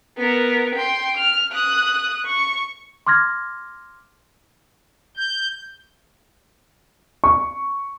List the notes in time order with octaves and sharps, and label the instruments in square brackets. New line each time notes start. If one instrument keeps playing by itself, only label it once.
[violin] B3 A#4
G5 C6
F6
D#6 F#6
C#6
[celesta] C6 D6 F6 G#6 A#6
[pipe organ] G6
[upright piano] C#6